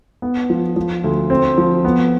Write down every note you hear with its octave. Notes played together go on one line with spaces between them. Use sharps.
B3
F3
F3
D2
C4
F3
B3